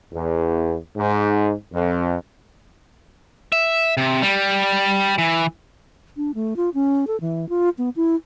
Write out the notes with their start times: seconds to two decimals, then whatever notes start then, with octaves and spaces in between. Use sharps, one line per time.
0.13 E2
0.98 G#2
1.73 F2
3.52 E5
3.97 C3
4.22 G3
5.18 E3
6.17 D4
6.35 A3
6.56 F4
6.74 C#4
7.07 A4
7.21 E3
7.49 F4
7.78 B3
7.96 E4